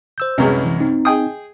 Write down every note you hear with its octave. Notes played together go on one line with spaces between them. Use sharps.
C5 E6 G6
C2 F#2 G#3 C#4 B4
E3
C4 D#4
G#4 G5 D#6